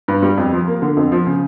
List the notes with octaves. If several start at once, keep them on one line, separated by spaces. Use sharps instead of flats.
G2
G3
F2
F3
A#3
D3
F2
F3
C#3